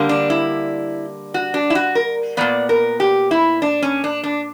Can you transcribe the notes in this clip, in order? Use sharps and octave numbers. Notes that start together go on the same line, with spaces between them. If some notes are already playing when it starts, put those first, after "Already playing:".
Already playing: D3 G3 A#3
D4
E4
F#4
D4
E4
F#4
A#4
A#2 G3 B3 D5
A#4
G4
E4
D4
C#4
D4
D4